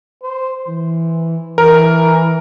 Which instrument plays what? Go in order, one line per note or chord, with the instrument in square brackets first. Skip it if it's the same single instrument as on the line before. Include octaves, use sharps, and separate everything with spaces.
[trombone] C5
E3
[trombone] E3 [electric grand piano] A#4